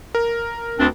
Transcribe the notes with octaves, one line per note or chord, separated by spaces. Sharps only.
A#4
D2 C4 D4